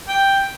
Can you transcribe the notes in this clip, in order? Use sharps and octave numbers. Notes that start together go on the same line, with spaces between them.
G5